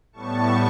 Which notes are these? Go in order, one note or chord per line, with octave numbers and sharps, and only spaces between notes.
A2 G3 B3 A5 C#6